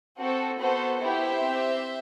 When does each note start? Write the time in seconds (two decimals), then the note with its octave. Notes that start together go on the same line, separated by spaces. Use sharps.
0.18 C4 F#4 A4
0.59 B3 F#4 A4 C5
0.99 B3 E4 G4 C5 E5
1.40 C4 G4